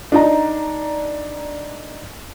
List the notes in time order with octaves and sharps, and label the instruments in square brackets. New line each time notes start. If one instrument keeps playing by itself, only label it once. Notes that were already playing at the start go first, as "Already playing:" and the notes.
[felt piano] D4 D#4 A#5